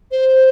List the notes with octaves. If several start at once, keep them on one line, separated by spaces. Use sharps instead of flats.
C5